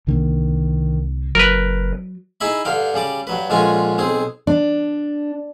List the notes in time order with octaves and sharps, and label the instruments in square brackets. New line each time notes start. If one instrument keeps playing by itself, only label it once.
[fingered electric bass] C2 D3 A#3 [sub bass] D#3
[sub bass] F#1 [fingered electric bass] F#3 [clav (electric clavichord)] A#4 B4
[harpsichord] D#4 E4 G#4 E5 B5
G2 D3 F5 G5
C#3 G3 D5 D6
G2 F#3 B4
A#1 D3 G#3 C#4 F4 G#5
B1 C4 G#4
[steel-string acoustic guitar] D4